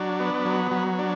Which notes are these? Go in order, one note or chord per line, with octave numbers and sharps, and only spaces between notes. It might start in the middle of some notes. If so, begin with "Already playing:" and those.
Already playing: F#3 D4
B3
F#3
F#3
D4